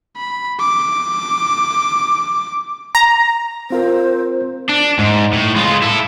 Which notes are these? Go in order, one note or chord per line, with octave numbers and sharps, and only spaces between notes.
B5
D6
A#5
C4 F4 A#4 C5
D4
G#2
A2
G#3 F4
E4 A4